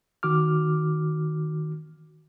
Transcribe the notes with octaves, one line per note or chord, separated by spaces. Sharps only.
D#3 F#4 D6 F6